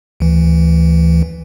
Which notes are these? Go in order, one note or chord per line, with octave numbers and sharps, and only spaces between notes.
D2 E3